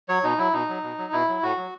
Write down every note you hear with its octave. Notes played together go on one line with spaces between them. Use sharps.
F#3 C#5
B2 D#4
F#3 E4
B2 D#4
F#3
B2
F#3
B2 E4
F#3
A2 F#4
F#3